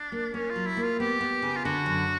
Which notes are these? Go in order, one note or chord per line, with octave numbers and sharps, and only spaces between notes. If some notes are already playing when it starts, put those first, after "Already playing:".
Already playing: D4
A#3
A#3 C#4
F4
F#3
E4
A#3
F4
B3 G4
B3
C#3
F4
D3 F#4
F#2